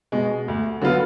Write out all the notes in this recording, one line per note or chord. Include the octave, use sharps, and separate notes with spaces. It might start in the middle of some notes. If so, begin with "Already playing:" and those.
B2 G#3
D2
D3 F#3 B3 F4